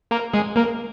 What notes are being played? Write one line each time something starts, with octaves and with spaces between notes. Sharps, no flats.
A#3 A#4
G#3 G#4
A#3 A#4